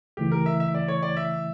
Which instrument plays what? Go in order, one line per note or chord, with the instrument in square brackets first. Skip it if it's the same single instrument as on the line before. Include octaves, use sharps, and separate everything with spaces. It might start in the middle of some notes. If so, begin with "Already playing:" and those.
[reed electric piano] C#2 C#3 E3 A3 E4 [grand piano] G4
[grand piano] A#4
E5
E5
D5
C#5
D5
E5